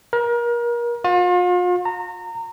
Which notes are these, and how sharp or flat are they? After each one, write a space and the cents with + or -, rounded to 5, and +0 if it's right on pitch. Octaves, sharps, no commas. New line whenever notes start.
A#4 +30
F4 +40
A#5 -25